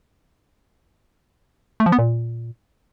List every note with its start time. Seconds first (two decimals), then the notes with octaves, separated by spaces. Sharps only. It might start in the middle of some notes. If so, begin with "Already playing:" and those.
1.80 A3
1.86 F3
1.92 B3
1.99 A#2